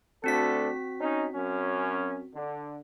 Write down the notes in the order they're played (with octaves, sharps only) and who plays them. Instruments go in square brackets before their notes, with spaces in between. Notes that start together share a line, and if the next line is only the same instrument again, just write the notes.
[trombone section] D2 D4 A4 [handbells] C4 F#4 B6
[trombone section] C#4 D#4
F#2 C#4
D3